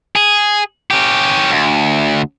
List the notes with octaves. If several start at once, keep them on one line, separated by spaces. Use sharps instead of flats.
G#4
C#4 G4
D2